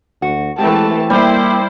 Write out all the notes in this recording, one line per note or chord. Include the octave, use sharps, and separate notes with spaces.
D2 F#4
E3 G#3 A3 C4 G4 A5
G3 A#3 E4 C5 G5